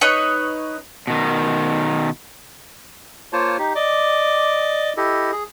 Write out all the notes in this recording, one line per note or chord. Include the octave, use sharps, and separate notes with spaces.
D#4 B4 C#5 D#5
B2 D#3
A#3 F4 C5 C#5 A5
D#4 G4
D5 D#5 D6
E4 G4 A4 D#5
G#4